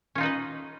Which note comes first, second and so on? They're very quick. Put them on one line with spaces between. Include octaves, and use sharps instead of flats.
C#4 F4 D#4 B4 D#5